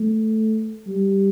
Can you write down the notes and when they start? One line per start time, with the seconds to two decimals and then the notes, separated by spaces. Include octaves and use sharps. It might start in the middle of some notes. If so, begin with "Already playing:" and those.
Already playing: A3
0.88 G3